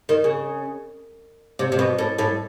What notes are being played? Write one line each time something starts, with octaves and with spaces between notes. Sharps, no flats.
D#3
C#3
C3
C3
B2
A2
A2